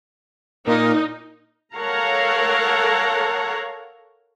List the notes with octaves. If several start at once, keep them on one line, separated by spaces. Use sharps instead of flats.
A#2 A#3 D#4 A#4
A4 A#4 C#5 F5 F#5 A#5